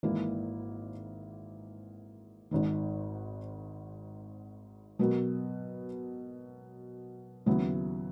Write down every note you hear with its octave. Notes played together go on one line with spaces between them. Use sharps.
G#1 G#2 E3 A#3 E4
G#1 G#2 D#3
B2 F#3 B3 F#4 A#4
D#2 C#3 F#3 B3 E4